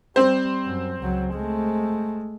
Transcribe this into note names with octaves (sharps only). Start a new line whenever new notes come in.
G3 C4 C5
F#2
C#2 F#3
G#3 A3